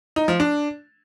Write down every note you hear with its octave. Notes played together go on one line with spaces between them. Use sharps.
D#4
F3
D4